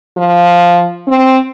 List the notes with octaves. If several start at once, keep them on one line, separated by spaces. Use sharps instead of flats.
F3
C4